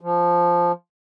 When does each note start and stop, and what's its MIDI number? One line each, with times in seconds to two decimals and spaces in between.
0.01 0.72 53